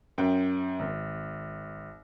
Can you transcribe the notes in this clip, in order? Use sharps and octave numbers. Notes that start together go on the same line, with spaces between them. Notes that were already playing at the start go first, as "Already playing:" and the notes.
F#2 G5
G#1